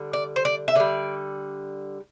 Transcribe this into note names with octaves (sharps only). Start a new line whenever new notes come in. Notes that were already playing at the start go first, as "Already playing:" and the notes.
Already playing: D3 G3
D5
C5
D5
E5
D3 G3 D5